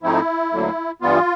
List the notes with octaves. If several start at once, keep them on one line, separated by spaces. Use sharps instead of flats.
G#2 F3 A3 C4 D#4 E4
D2 D3 F#3 A#3
G2 E3 G3 B3 F4